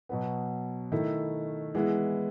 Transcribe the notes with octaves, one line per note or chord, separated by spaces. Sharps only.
B2 F#3 B3
D#3 A3 E4
E3 G#3 B3 E4